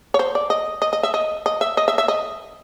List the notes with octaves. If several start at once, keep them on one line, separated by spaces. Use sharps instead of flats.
C#5
C5
D5
D#5
D#5
D#5
E5
D#5
D#5
E5
D#5
E5
E5
D#5